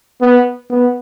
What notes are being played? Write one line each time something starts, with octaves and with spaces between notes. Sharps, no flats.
B3
B3